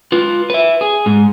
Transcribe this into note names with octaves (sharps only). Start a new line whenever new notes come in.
F4 B4
B4 E5
G#4
G#2